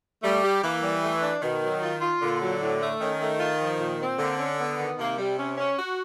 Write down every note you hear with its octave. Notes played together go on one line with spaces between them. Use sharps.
G3 A3
G4
E3 A#3
G3
A3
D4
B2 D#3
F#3
F4
F4
A#2 D3
F#3
A2
A3
D#3 C#4
A3
F4
F3
A#2
C4
D3 A#3
C#4
B3
D#3
C3 A#3
G3
C#4
C#4
F#4